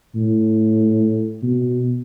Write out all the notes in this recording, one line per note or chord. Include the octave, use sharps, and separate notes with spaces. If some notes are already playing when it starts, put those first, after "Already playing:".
A2
B2